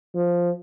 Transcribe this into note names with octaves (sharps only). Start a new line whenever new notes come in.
F3